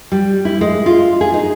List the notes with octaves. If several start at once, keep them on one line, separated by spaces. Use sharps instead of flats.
G3
E4
G#3
F4
G#4
D#4